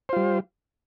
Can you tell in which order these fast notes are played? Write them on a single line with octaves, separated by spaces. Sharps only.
C5 F4 G3